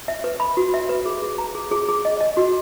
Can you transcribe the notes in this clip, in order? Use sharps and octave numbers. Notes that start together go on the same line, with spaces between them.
E5
B4
B5
F#4
E5
B4
G#4
G#4
A#5
G#4
G#4
G#4
D#5
D#5
F#4